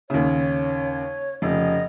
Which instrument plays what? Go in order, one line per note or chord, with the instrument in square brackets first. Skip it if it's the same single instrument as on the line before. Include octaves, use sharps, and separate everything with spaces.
[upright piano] D#2 C#3 [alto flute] C#5
[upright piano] F1 C#3 [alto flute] D#5